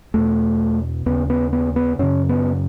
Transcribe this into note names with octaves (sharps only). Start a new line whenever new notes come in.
E2 B2 A3
D#2 C#3 B3
B3
B3
B3
F#2 C#3 C#4
B3